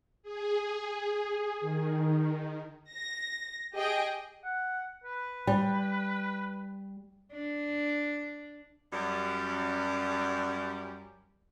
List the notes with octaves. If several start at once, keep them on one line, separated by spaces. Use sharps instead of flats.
G#4
D#3
A#6
G4 G#4 D#5 G5
F#5
B4
G3
D4
F#2 G3